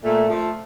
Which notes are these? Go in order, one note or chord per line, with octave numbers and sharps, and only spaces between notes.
A#2 A3
F3 A3